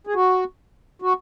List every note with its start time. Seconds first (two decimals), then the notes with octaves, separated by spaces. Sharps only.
0.07 G#4
0.15 F#4
1.02 F#4